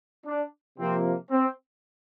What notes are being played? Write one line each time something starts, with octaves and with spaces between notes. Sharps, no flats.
D4
C3 F3 A#3 C4
C4